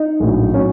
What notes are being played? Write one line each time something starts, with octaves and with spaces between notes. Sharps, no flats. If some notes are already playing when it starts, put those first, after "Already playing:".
Already playing: D#4
A#1 A2 F#3
A2 F#3 C#4